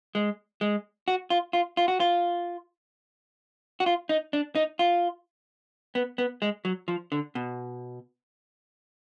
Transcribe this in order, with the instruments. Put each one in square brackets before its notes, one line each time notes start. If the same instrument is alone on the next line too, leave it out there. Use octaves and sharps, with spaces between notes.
[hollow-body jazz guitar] G#3
G#3
F#4
F4
F4
F4
F#4
F4
F#4
F4
D#4
D4
D#4
F4
B3
B3
G#3
F#3
F3
D3
B2